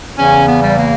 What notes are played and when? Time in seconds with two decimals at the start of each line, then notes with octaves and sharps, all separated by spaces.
0.17 E2 C#3 E3 C#4
0.45 B3
0.60 G3
0.76 A#3